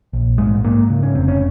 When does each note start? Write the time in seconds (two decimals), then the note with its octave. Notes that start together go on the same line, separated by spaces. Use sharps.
0.13 A#1
0.38 G#2 G#3
0.64 G#2 A#3
0.90 C#3
1.03 C#4
1.14 F1 C4
1.28 C#4